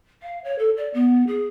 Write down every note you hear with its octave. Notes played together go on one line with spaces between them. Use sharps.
F5
C#5
A4
D5
B3
G#4